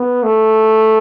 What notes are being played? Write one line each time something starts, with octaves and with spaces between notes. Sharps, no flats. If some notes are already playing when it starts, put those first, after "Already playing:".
Already playing: B3
A3